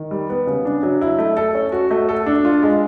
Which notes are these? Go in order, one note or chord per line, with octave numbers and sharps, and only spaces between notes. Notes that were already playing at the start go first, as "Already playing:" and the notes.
Already playing: D#3
G3
B3
C#3
D4
F#3
E4
A3
A4
C#4
F#4
A3
A4
D4
F4
G#3